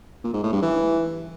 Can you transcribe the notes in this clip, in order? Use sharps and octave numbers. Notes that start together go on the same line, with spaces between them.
A#2
G#2
A2
G2
E3